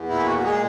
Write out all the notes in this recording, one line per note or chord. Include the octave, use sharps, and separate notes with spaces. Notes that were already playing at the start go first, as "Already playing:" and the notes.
Already playing: E2
A#2 E4
F#4
F#4
G#3 G#4